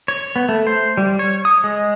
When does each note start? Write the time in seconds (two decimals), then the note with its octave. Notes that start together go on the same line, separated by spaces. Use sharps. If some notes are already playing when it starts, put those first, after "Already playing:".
0.08 C#5
0.36 B3
0.49 A3
0.67 C5
0.97 G3
1.19 C#5
1.45 D#6
1.64 G#3